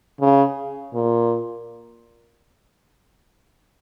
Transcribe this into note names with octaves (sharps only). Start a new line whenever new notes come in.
C#3
A#2